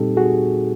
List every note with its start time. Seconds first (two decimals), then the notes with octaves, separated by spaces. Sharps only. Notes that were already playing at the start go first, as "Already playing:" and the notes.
Already playing: A#2 G3 C4 D#4 G4 A4
0.17 F#4 G#4